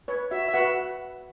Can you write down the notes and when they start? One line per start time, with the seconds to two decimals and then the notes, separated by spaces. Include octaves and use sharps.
0.08 B4 C#5
0.31 F#4 E5
0.48 E5
0.54 F#4 B4 F#5